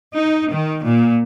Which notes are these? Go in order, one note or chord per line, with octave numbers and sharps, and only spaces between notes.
D#4
D#3
A#2